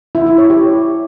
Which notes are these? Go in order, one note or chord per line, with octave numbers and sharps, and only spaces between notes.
E4
E4
C#5
G4